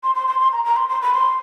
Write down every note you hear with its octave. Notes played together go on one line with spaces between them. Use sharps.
C6
C6
C6
C6
A#5
A#5
C6
C6
B5
C6